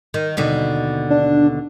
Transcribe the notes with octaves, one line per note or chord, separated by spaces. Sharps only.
D#3
D#2 B2 D3
D4